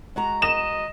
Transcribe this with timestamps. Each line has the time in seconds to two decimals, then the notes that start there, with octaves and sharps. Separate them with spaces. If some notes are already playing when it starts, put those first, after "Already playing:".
0.16 G#3 F#4 A#5
0.42 D#5 E7